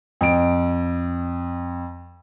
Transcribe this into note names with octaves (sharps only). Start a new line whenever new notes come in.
F2 D7